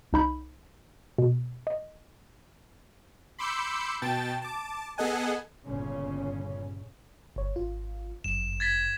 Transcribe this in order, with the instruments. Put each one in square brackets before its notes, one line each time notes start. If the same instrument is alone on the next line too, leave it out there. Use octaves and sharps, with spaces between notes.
[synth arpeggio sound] C2 D#4 B5 G6
B2
D#5
[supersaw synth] B5 C6 D6 E6 G6 C#7
B2 G5 A5 A6
A5 D6
B3 G#4 A4 D#5 F#5 G#5
[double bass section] G1 A#2 C#3 C#4
[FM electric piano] G1 C#5
G#1 F4
[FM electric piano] G1 F#2 [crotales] E7
[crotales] G#6 A6 B6